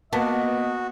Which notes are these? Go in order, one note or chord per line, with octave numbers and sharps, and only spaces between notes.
A#3 B3 F#4 D#5 A5